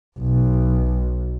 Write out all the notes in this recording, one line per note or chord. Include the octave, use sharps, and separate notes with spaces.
B1